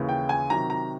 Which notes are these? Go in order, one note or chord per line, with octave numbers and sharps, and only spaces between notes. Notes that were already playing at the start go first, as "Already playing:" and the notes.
Already playing: D#2 C#3 E3
G5
G#5
C3 D#3 F#3 A#5
A#5